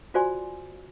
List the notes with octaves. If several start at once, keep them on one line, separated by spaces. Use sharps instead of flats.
F4 F#4 C5 D5 G#5 C6